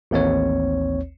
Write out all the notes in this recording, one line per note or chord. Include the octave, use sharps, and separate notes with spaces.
A1 D#2 C4 C#5